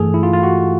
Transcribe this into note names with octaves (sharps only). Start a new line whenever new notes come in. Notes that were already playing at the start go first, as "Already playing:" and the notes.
Already playing: G2 E3 A3 G#4 A4
E4
F4
F4
F#4